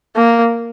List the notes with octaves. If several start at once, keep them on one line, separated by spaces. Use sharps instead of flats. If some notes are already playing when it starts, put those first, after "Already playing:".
A#3